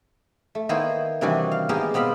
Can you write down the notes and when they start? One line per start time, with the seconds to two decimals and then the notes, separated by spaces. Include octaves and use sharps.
0.55 A3
0.69 D#3 A#3 B3 E4 C5 C#5
1.21 C3 D#3 E3 G3 D4 F#4
1.51 F5
1.69 G#3 A#3 B3 D#4 G4 A#4
1.94 B2 B3 C4 F5 B5